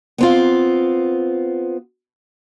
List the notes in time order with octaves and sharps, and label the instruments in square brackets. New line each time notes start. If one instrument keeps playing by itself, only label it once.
[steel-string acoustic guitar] B3 C4 F4